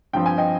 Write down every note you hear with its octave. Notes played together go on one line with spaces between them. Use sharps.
G2 F3 C4 G5
G#5
D#5 G5